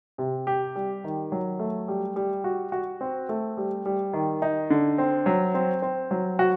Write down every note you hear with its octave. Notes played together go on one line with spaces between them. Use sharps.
C3
G4
G3
D#3
F#3
A3
G3
G3
F#4
F#4
C4
A3
G3
G3
D#3
D#4
D3
C4
F#3
C4
C4
F#3
F#4